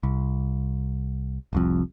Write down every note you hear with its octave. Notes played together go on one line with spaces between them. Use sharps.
C2
F1 C2 F2